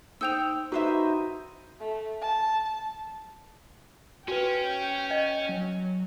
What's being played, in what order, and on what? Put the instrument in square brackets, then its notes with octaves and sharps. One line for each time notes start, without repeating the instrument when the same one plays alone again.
[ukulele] D#4 C5 G5 [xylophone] E6 G6 F7
[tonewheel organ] D#4 [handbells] F#4 A#5 [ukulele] B4 C5 E5
[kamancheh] A3
A5
[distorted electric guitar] C#4 [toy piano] F#4 B4 [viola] G5
[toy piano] D#5
[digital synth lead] F#3